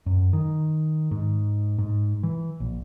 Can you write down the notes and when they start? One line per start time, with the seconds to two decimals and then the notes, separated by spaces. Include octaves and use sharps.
0.06 F#2
0.33 D#3
1.11 G#2
1.78 G#2
2.23 E3
2.60 A#1